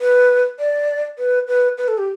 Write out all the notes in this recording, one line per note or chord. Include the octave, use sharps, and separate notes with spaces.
B4
D5
B4
B4
B4
A4
G4